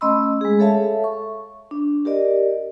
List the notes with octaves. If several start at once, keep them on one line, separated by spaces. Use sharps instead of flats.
A3 C#4 D#5 B5 C6 E6
G#3 G#4
A4 C#5 E5 F5 A5
C#6
D4
G4 A#4 D5 D#5